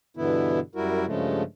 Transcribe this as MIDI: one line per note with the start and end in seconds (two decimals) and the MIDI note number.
0.17 0.60 43
0.17 0.60 47
0.17 0.60 50
0.17 0.60 52
0.17 0.60 59
0.17 0.60 64
0.75 1.05 42
0.75 1.05 55
0.75 1.05 64
0.75 1.05 66
0.75 1.05 70
1.06 1.43 43
1.06 1.43 49
1.06 1.43 53
1.06 1.43 56
1.06 1.43 57